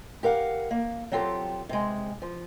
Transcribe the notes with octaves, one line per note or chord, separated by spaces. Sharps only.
G4 A#4 F5 F#5
A#3
F#3 C4 F4 G4 A4
C3 G#3
F3